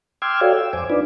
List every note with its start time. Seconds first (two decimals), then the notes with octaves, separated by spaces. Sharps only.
0.22 G5 C6 D6 E6 F6 G#6
0.41 F#4 A4 C#5 D5 F5 G5
0.53 E6
0.73 F2 C5 G#5 D6
0.90 D4 D#4 F4 B4 D5